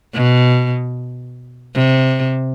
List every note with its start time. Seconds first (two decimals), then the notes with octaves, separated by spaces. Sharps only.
0.13 B2
1.75 C3